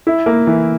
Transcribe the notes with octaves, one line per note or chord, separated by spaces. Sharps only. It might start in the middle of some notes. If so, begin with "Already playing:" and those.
E4
A#3
E3